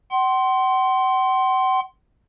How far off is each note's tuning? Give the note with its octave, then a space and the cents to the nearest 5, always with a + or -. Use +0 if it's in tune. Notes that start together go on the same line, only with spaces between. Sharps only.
F#5 +45 C6 +5